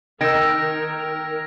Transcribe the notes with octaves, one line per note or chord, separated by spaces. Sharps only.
D#3 A#4 G5 E6 G#6 A#6 D7